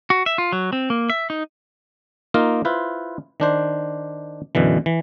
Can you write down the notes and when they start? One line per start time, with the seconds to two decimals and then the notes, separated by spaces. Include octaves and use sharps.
0.10 F#4
0.26 E5
0.38 F4
0.52 F#3
0.73 C4
0.90 A#3
1.10 E5
1.30 D#4
2.34 A#3 D#4 F4 A#4
2.65 E4 F4 B4 C5
3.40 D#3 D4 C5
4.55 F#2 B2 D3 E3
4.86 E3